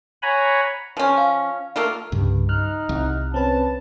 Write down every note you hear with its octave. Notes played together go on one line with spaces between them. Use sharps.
C#5 F#5 G#5 A#5 B5
F3 C#4
F5
A3 A#3 F4
C2 G2 C#3
D#4 F6 F#6
C2
C4 C#4 B4 A5